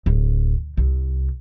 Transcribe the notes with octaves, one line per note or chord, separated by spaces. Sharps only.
D1
C2